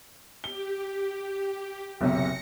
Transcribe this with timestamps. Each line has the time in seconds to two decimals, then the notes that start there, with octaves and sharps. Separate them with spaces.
0.44 G4 G7
2.01 F#1 B1 C3 A#6 C#7